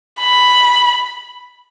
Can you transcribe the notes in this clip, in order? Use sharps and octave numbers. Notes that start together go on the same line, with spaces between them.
B5